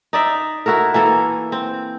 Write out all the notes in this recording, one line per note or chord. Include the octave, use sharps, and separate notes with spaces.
D#4 D5 E5
E4 F#4 A4 A#4
E3 A#3 A4
C4